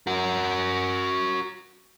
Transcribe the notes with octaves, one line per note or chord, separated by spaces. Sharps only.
F#4 A#4